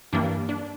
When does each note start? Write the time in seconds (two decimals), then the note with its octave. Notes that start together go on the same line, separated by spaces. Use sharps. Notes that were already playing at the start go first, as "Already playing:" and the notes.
0.13 G2 E3 G3 A#3 D4
0.49 D4